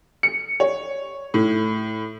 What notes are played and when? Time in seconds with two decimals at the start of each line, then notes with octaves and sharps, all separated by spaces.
0.23 C#7
0.60 C#5
1.34 A2